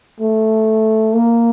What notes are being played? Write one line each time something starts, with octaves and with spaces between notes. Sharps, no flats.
A3
A#3